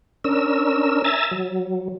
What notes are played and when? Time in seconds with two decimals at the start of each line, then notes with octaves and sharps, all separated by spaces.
0.24 C#4 D4 A#4 E6
1.04 E5 G#5 A#5 E6 A6
1.31 F#3